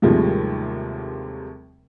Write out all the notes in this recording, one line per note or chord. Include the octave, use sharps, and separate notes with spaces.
D#2 A2 C3 F3 G3 G#3